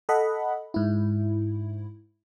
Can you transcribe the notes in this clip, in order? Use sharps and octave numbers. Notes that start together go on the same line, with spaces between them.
A4 D#5 F#5 B5
G#2 E4